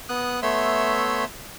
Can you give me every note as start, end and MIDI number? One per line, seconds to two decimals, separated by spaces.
0.09 0.40 59
0.09 0.40 87
0.09 0.40 90
0.43 1.25 57
0.43 1.25 59
0.43 1.25 73
0.43 1.25 76
0.43 1.25 84
0.43 1.25 88